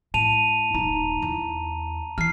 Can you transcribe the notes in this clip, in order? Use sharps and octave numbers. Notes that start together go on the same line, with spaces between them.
A2 A5 D#7 F7
D#1 D#4 A#5
E2
E3 F6 C7